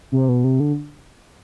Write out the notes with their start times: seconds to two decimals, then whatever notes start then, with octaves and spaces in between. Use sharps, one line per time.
0.12 C3
0.29 B2
0.44 C3
0.60 D3